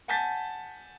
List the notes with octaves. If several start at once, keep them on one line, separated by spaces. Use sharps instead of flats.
F#5 G#5 A5 G6 A6 B6